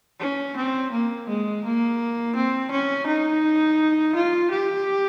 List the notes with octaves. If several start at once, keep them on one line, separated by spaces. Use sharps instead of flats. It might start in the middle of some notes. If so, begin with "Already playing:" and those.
C#4
C4
A#3
G#3
A#3
C4
C#4
D#4
F4
G4